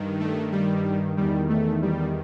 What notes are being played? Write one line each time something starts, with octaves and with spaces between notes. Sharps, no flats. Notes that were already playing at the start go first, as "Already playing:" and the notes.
Already playing: G2 D#3
A3
G3
E2 D#3 G3
A3
G3